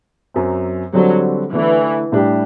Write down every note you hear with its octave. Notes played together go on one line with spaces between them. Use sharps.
F#2 F#3 C4
D3 F#3 G3 C4 F#4 A4
D3 E3 A3 E4
A2 G3 D4 G4